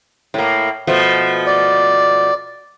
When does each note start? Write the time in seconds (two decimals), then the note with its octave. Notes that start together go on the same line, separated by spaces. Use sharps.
0.34 A2 A#3
0.87 B2 F3 A3
1.46 D5